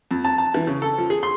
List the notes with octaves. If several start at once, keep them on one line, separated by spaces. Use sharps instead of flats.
F2
A5
A5
E3
C#3
A4
F3
G#4
C6